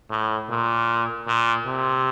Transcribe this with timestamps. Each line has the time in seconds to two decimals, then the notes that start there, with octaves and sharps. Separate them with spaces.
0.10 A2
0.50 A#2
1.27 A#2
1.66 C3